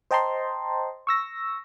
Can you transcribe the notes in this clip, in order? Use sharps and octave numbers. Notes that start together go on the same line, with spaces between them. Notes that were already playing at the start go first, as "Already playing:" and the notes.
C5 D#5 G5 A5 A#5 C6
C#6 E6 A#6